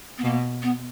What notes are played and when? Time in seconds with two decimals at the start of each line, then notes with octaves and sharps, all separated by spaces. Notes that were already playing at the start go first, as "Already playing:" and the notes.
0.18 B3
0.23 B2 A#3
0.62 B3